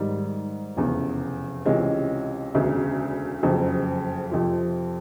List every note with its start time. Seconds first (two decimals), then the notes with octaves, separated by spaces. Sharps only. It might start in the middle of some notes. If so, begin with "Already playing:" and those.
Already playing: G#2 D#3 G3
0.77 F1 E2 C#3
1.66 C#2 C3 E3 G#3 C#4
2.54 E1 D2 C#3
3.43 F#1 F2 C#3
4.31 F2 C3 F3